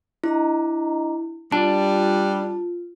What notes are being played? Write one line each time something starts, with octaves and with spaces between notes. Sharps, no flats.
D4 E4 D#5 A#5
G3 D4 F4 A5